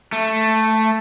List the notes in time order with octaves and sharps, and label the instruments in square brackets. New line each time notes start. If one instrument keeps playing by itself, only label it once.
[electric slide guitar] A3